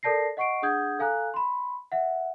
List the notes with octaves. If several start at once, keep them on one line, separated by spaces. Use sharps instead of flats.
A4 A#4 D5 A5 A#6 C7
D#5 F#5 C#6 C7 D7
D4 G#4 F#5 D#6 G6 G#6
A4 F5 G#5 A#5 F#6
B5 C6
E5 F#5